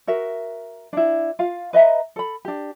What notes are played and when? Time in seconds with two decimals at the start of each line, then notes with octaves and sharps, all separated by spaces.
0.07 F#4 A#4 E5
0.93 D4 E4
1.39 F4 F5
1.73 B4 D#5 E5 A#5
2.16 A4 B5
2.45 D4 G4